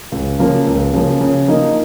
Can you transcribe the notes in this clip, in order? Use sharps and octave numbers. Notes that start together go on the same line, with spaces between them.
C#2
C#3 F3 A#3
C#2
C#3 F3 A#3
C#3
F3 A#3 D#4